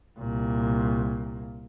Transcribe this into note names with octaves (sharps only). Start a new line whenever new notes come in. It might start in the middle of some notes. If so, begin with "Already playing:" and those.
C2 A#2